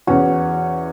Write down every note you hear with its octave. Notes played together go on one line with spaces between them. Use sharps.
E2 E3 C#4 F#4